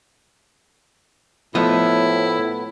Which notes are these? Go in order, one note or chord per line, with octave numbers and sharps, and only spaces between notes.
A2 F3 A3 B3 E4 A4 D#5